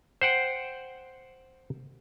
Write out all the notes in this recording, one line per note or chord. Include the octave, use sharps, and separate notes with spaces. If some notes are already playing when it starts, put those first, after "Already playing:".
C5 F#5 G5